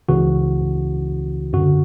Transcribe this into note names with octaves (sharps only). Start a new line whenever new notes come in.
C#2 C#3 E3 F#4
F#2 D3 F#4